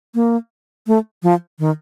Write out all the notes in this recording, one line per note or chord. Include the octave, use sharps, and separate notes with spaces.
A#3
A3
F3
D#3